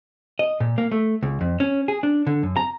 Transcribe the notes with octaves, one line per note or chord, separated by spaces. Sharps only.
D#5
A#2
A#3
A3
C#2
F2
C#4
G#4
D4
D3
F#2
A#5